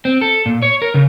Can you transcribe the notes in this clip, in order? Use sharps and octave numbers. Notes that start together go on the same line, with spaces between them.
C4
A4
A#2
C#5
A#4
C#3